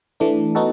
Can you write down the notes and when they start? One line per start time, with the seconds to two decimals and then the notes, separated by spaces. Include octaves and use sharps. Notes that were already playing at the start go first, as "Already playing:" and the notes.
0.20 E3 A3 D4
0.55 B3 D#4 F#4 A4